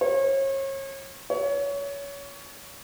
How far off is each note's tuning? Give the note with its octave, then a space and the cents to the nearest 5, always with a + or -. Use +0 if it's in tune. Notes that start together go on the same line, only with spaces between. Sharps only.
C#5 -35
C#5 +25